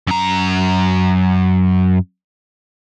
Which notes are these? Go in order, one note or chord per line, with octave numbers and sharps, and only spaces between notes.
F#2 A#5